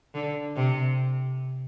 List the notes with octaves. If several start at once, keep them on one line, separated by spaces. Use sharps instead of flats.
D3
C3